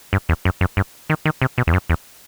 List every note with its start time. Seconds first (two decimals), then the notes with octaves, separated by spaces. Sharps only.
0.13 G2
0.29 E2
0.45 F#2
0.61 F#2
0.77 G2
1.10 D#3
1.25 D#3
1.42 C3
1.58 B2
1.67 E2
1.73 F#2
1.90 E2